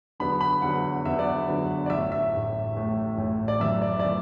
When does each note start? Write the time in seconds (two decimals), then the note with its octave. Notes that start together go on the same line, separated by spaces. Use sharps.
0.20 E2 D3 F#3 B3 B5
0.41 B5
0.62 E2 D3 F#3 B3 F#5
1.05 E2 D3 F#3 B3 E5
1.19 D5
1.48 E2 D3 F#3 B3
1.86 D5
1.90 A1 A2 A3 E5
2.12 E5
2.33 A1 A2 A3
2.76 A1 A2 A3
3.18 A1 A2 A3
3.48 D5
3.60 F#2 E3 A3 E5
3.82 D5
4.00 D5
4.03 E3 A3 E5